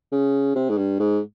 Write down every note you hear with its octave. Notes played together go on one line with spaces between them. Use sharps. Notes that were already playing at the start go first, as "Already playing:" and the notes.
C#3
C3
G#2
G2
G#2